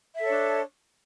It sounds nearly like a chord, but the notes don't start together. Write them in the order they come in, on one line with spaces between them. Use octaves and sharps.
E5 A4 C#5 D4